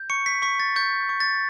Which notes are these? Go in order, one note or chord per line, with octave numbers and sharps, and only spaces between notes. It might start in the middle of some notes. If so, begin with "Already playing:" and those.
Already playing: G6
C#6 C#7
B6
C#6 B6
A6
C#6 G6
C#6
A6